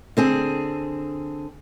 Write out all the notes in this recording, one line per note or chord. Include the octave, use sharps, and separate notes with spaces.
D3 C4 G#4